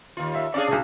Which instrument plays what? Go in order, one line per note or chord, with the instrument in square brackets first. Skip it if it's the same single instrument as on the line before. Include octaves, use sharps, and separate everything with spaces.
[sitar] D#2 F4
[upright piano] E5
[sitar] C#4 D4 G#4 [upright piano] D5 F5
[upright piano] B1 C#3